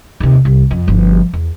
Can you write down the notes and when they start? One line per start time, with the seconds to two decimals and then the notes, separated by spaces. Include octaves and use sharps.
0.20 D#2 C3
0.45 C2
0.71 F2
0.88 G1 F3
1.33 E2